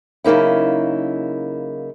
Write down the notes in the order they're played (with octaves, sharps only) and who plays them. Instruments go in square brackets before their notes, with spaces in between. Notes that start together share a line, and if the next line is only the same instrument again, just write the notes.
[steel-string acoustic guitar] C#3 F#3 A#3 D#4 E4